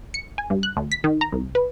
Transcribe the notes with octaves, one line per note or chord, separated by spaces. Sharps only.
C#7
G#5
G2
F#6
D2
B6
D#3
A#5
C2
B4